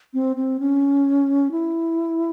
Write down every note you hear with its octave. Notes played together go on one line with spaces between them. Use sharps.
C4
C4
C#4
E4